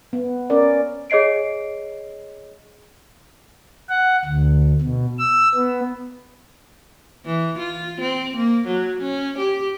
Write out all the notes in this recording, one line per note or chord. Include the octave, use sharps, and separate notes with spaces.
B3
C#4 A#4 D5
G#4 C#5 D#5 C7 D7
F#5
D2
B2
E6
B3
E3
F4
C4
A#3
F#3
C#4
G4